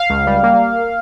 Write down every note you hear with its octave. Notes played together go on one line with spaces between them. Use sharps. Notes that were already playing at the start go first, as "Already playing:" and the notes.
Already playing: F5
C#2
G3
A#3